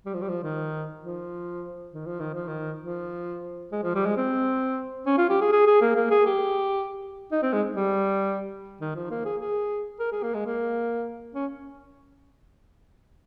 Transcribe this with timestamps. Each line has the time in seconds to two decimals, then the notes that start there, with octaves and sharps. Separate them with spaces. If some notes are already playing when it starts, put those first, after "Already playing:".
0.06 G3
0.14 F3
0.22 G3
0.28 F3
0.43 D#3
1.03 F3
1.93 D#3
2.06 F3
2.20 D#3
2.34 F3
2.48 D#3
2.82 F3
3.72 G#3
3.84 F3
3.95 G3
4.05 G#3
4.17 C4
5.06 C#4
5.18 F4
5.29 G4
5.41 G#4
5.52 G#4
5.67 G#4
5.81 A#3
5.96 A#3
6.11 G#4
6.26 G4
7.32 D#4
7.43 C4
7.53 G#3
7.76 G3
8.81 D#3
8.95 F3
9.11 A#3
9.25 G#4
9.41 G#4
10.00 A#4
10.12 G#4
10.23 A#3
10.34 G#3
10.46 A#3
11.35 C#4